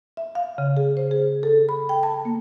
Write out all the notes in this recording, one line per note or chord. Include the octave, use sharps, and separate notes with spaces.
E5
F5
C#3
G#4
C5
G#4
A4
B5
G5
A5
A#3